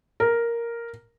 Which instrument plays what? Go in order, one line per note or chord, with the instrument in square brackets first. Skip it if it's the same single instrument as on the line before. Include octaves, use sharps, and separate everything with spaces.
[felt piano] A#4